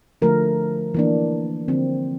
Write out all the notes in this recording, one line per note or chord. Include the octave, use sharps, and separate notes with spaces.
D3 F3 A3 A#4
E3 A#3 D4
D3 F3 C4